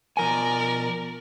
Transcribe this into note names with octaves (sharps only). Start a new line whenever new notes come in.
B2 F3 A#4 D5 G#5